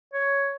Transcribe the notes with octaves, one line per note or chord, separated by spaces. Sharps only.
C#5